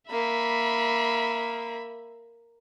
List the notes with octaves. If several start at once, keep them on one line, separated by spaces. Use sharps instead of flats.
A#3 E5 B5